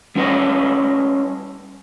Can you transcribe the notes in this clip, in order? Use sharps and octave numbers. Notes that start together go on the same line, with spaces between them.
G3 C#4 E4 B4 C#5 D#5